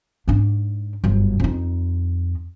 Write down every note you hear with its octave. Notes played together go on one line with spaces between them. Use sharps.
G#2 D4
G1 F#2
F2 D#4